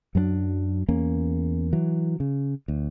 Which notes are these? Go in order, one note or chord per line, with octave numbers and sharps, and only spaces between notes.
F#2 F#3 A3 D4
E2 A#3 C#4
E3 F#3
C#3
D2